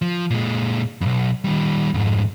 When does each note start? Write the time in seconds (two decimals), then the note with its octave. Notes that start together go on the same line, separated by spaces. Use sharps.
0.02 F3
0.31 A#2 G#3
1.01 B1 F2
1.44 D#3 G3
1.94 F2 G#2